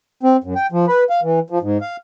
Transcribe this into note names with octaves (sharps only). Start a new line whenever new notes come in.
C4
F#2
G5
F3
B4
F5
E3
F3
G#2
F5